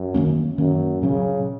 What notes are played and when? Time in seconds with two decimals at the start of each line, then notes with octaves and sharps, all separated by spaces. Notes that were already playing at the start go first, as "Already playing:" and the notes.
Already playing: F#2
0.14 D#3 F#3 A#3 C#4
0.58 F#2 D#3 A#3 C#4
1.02 A#2 C#3 F#3 C#4